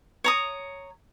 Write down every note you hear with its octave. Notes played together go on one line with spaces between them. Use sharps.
C#5 A#5 D#6